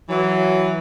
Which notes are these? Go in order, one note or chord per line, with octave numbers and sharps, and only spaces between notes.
E3 F#3